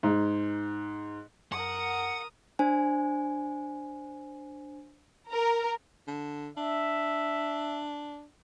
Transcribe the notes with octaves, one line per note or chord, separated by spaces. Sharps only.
G#2
F#2 A#4 F#5 D#6
D4 C5 G#5
A#4
D3
D4 E5